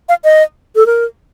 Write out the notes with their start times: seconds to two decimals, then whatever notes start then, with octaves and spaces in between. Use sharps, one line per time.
0.09 F5
0.24 D#5
0.75 A4
0.86 A#4